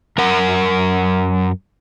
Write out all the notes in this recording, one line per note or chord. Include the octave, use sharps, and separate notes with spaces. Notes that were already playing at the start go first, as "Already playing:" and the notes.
F#2 A#4 F#5